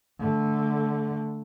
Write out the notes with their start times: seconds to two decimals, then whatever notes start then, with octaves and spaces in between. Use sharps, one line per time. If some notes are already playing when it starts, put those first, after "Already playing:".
0.19 D3 A3